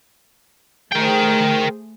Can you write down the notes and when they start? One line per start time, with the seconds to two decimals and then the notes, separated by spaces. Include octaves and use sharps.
0.92 A3 G#4 A#4 C5 G5